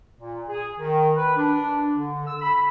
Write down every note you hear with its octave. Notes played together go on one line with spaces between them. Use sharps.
A#2
G#4
D#3
B4
D4
D3
E6
B5